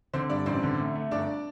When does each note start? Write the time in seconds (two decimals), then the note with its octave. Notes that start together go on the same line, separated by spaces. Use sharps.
0.13 D3 C4 C5
0.30 G2 D4 D5
0.46 A1 C4 C5
0.63 D3
0.79 A3
0.95 A3
1.11 G1 D4 D5